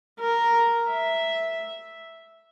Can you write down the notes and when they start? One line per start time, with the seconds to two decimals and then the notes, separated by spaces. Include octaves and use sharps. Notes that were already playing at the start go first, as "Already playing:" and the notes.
0.19 A#4
0.90 E5